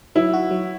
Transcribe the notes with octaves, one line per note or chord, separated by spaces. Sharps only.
F#3 E4
F#4
F#3